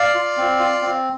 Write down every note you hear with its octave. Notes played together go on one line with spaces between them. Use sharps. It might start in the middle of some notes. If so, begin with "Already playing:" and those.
Already playing: D5 F5
F4
C4
F4
C4